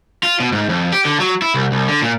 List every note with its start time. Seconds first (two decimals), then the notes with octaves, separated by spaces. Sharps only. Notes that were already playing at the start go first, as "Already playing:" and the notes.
0.23 F4
0.40 B2
0.53 G#2
0.69 F2
0.93 G4
1.05 D3
1.20 F#3
1.42 E4
1.55 C2
1.72 C2
1.88 D3
2.02 A#2